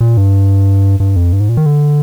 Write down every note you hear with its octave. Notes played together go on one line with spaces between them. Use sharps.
A#2
G2
G2
F2
G2
G#2
A#2
D#3
D3